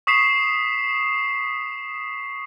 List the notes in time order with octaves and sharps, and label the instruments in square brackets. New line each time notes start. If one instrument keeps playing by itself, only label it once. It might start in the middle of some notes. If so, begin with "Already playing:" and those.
[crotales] C#6 D#6 B6 C7 E7 F7